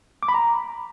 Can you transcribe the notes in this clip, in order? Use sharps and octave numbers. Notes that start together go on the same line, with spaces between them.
D6
B5
A#5